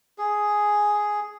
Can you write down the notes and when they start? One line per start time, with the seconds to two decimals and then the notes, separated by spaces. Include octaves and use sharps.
0.18 G#4